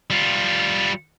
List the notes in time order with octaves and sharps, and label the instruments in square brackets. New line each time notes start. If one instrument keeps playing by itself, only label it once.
[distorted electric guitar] G3 F4